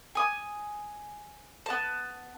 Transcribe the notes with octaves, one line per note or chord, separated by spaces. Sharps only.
G#5 D#6
B3 A5